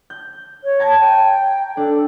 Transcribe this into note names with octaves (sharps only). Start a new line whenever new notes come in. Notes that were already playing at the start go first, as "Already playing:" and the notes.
G6
C#5
A5 A#5 G#6
G5
D4 A4